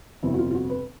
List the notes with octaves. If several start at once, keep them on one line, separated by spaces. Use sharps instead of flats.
G1 F2 C3 E4
F#4
F4
F4
F#4
B4